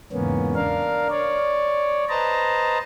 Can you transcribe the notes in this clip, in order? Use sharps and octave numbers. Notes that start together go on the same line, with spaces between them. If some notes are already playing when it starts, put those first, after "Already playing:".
E2 G#2 C#3 A#3 B3 C#4
D4 A#4 F5
C#5 D5
B4 C5 D#5 A5 A#5